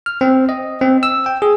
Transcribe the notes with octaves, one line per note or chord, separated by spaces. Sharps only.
F6
C4
D#5
C4
E6
G5
G#4